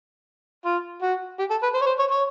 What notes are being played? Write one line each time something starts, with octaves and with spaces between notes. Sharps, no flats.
F4
F#4
G4
A4
B4
C5
C#5
C5
C#5
C#5